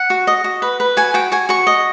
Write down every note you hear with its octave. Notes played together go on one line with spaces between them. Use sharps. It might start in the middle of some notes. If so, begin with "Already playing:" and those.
Already playing: F#5
F#4
D#5
F#4
B4
B4
F#4 G#5
F#4 G5
F#4 G#5
F#4 C#6
D#5